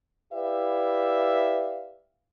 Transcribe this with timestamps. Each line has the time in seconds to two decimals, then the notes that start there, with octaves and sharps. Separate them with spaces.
0.33 E4 G4 B4 D5 E5 F5